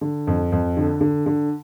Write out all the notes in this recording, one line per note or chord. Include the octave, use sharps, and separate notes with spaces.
D3
F2
F2
D3
D3
D3